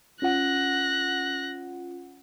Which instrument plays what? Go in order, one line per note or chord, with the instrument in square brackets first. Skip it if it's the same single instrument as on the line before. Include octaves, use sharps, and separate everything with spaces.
[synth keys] C#4 F4 F#5 [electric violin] F#6 A#6